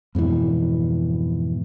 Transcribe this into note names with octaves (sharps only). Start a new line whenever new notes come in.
F2 G#2 B2 E3